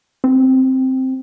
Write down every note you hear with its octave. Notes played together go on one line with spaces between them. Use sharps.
C4